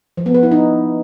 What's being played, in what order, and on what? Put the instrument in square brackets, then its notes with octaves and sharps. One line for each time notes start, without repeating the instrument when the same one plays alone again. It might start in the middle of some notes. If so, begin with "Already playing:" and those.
[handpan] F3
B3
B4
E4
D#4